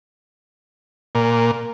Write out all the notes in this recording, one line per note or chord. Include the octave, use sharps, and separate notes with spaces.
A#2